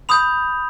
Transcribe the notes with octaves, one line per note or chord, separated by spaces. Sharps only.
B5 D#6 G6 F7